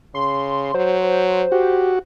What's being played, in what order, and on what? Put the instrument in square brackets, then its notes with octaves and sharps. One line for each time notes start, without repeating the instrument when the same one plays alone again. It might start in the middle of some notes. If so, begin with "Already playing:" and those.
[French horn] C#3 [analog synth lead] C6
[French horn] F#3 [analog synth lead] C5
[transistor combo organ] F#4 [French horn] G4